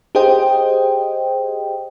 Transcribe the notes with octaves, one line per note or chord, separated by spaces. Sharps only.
G4 G#4 C5 D#5 G5